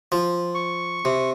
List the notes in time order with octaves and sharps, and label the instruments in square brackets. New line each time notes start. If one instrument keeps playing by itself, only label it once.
[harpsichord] F3
[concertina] C#6
[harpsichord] C3